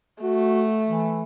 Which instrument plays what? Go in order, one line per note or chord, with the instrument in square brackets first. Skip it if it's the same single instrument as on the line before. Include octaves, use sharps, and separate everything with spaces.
[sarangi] A3 [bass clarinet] F#4
[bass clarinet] E3